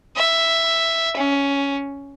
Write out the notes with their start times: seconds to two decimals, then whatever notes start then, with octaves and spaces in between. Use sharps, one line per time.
0.17 E5
1.16 C#4